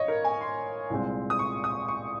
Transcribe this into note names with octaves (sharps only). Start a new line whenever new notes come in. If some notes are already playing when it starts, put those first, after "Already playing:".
Already playing: G#1 C#5 D#5
A#4
G#5
C6
C2 A#2 G#3 C4
D#6
C#6
D#6
C#6